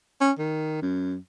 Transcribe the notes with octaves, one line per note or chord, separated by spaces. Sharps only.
C#4
D#3
F#2